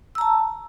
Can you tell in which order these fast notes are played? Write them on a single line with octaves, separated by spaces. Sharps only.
E6 A#5 A5